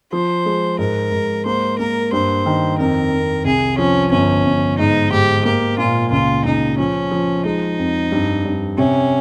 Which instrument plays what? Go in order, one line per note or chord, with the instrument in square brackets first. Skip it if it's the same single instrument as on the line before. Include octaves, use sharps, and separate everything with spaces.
[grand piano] F3 [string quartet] C5
[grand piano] G#3
[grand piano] G#2 [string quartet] A#4
[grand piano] G#2
[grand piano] A#3 [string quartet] C5
[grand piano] A#3 [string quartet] A#4
[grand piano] G2 [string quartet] C5
[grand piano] D#3
[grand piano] F2 [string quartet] A#4
[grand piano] F2
[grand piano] C2 [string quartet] G#4
[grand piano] F3 [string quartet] C#4
[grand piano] G1 [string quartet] C#4
[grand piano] G1
[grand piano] G#2 [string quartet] D#4
[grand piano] G#2 [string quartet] G4
[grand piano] A#3 [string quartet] G4
[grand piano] A#2 [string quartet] F4
[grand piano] C#2 [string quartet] F4
[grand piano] C#2 [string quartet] D#4
[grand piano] F3 [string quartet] C#4
[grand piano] F3
[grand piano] G#3 [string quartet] D#4
[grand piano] F2
G2
G2
[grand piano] C3 [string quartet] C#4